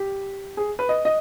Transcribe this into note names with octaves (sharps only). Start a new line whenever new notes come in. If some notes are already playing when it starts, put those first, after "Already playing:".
Already playing: G4
G#4
B4
D#5
D#5